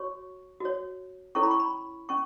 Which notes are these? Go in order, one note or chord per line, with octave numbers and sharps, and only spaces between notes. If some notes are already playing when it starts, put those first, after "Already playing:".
Already playing: F#4 C#5 C#6
F#4 C#5
C#4 E4 A4 C#5 C#6
B5
C#6
B5
C#4 C#6